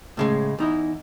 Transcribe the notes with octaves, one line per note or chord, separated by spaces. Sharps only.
A2 C#3 G#3
E2 D#4 E4